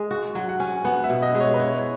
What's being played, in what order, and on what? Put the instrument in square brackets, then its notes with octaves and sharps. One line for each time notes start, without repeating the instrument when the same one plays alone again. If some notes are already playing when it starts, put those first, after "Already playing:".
Already playing: [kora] G#3
F#4
[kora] F#3 [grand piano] F#5
[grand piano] F#5
[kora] C#4 [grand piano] G#5
[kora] B3 [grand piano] F#5
[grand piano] E5
[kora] B2
[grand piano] D#5
[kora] G#3
[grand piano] C#5
B4
[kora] E4 [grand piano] C#5